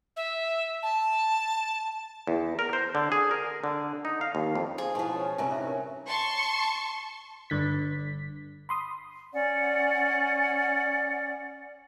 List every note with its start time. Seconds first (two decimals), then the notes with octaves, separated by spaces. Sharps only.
0.16 E5
0.83 A5
2.27 E2
2.59 A#4
2.73 C5
2.95 D3
3.12 G#4
3.31 A#4
3.64 D3
4.05 D#4
4.21 F5
4.35 D#2
4.55 F2
4.78 F3 G#4
4.95 G#2 B2 F3 E4 C6
5.16 C#4 B4 G#5
5.38 G2 C3 G#5 A#5
5.50 D#4 C5 E5
5.66 C#4 A#4
6.08 A5 C6 C#6
7.50 G1 G2 D3 B6
8.69 B5 C6 D#6
9.33 C#4 D5 F#5